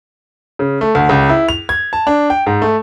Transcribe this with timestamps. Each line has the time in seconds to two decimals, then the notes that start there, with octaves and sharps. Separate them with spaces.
0.59 C#3
0.81 A3
0.95 D2
1.09 C#2
1.29 E4
1.49 F7
1.69 G#6
1.93 A5
2.07 D4
2.30 G5
2.46 G#2
2.62 A3